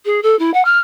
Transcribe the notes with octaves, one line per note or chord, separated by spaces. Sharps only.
G#4
A4
E4
F#5
F6